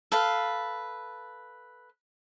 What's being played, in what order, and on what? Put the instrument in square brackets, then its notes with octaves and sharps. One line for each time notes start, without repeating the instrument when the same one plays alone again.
[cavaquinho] A4 B4 F5